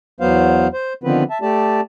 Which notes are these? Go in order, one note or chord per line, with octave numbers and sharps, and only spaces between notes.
E2 F#3 B3 C5 F5
C5
D3 D#3 F3 B3 C4 B4
E5 A5
A3 G4 D5 A5